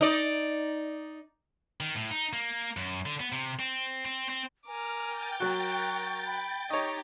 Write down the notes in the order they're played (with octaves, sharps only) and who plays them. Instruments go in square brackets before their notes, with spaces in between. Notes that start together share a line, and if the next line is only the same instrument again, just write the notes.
[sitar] D#4 D5
[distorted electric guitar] D#3
A2
D#4
A#3
F#2
D3
B3
C3
C4
C4
C4
[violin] A#4 D6 [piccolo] G#5 [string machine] F6
[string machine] G5 A6
[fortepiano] F#3 F#4 [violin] A#4 [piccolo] C#6
[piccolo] B5
[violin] D#4 G4 [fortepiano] C#5 D#5 [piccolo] C#6